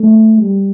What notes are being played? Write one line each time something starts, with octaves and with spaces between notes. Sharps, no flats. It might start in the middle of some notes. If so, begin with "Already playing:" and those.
Already playing: A3
G3